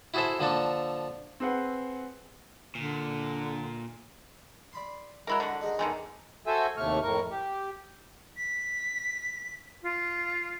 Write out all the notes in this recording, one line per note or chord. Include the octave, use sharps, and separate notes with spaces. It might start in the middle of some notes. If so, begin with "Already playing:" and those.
E4 F#4 G#4 A4 C5 E5
D3 F3 A#3 D4 A4
C4 G#4 B4 F#5
A#2 D3
D5 B5 C6
F#3 G#3 E4 A#4
D3 F#4
D#4 G#4 A#4
E2 D3 D#3 G#3
F#4 A4 C5 E5 G#5 E6
D#2 A2 C3 A3 C#6 F6
F2 A2 A#4 C#6
G4
B6
F4